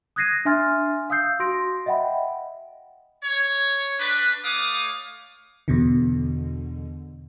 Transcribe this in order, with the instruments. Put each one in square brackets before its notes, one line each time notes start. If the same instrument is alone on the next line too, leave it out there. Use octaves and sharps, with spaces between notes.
[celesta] D#6 F#6 G#6 A#6 C7 D#7
D4 E5 G#5 C6 F6 A6
F5 D#6 E6 G6 C7
F#4 C6 A#6 D7
D#5 E5 F#5 G5 B5
[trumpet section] C#5
D4 B4
A3 C#5 F5 D6 D#6
[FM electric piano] E2 B2 D3